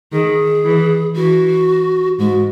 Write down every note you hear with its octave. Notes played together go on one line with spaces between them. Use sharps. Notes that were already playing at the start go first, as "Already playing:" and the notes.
D#3 G#4
E3
E3 F#4
G#2 F#4